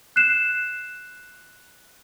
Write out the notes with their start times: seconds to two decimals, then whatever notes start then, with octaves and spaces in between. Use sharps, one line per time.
0.16 F#6 C7 E7